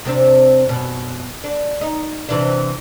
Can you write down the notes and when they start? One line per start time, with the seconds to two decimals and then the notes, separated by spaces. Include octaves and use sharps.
0.05 C3 C4 D4
0.66 F#2 B2
1.44 D4
1.81 D#4
2.29 C3 E3 D4